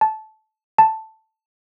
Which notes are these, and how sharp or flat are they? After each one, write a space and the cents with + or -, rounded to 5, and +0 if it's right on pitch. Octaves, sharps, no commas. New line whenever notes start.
A5 -15
A5 +5